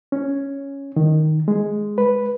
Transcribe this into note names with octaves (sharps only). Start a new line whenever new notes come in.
C#4
D#3
G#3
B4